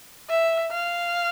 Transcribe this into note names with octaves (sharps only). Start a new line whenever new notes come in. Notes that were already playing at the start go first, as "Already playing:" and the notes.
E5
F5